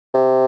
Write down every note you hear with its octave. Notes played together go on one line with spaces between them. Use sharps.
C3